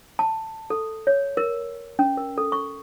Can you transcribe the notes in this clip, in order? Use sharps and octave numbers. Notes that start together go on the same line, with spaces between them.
A5
A4
C#5
A#4
C#4
A#4
A4
C#6